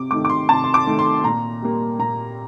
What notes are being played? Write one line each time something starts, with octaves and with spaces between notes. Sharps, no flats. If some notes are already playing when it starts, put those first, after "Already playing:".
Already playing: C3 D6
D#3 A3 D6
D6
C6
C3 A5
C6
D6
D#3 A3
C6
A#2 A#5
G3 A#3
A#2 A#5